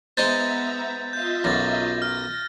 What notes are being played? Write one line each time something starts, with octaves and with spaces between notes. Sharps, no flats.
G#3 B3 D#4 C5 E5 A#5 G6 A6
F4 D#5 E5 G6
B1 F#2 A6 A#6
F6 A#6